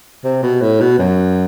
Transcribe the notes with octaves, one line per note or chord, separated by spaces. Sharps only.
C3
B2
A2
B2
F#2